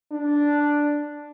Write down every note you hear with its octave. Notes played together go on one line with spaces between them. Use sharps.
D4